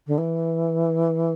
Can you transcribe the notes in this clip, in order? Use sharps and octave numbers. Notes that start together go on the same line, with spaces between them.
D3
E3